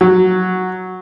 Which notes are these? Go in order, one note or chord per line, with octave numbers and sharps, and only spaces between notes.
F#3